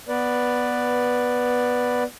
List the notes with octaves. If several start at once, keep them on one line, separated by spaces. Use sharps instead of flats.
B3 B4 D5